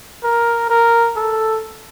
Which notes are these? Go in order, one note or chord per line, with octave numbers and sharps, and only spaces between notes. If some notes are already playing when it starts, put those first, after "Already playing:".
A#4
A#4
A4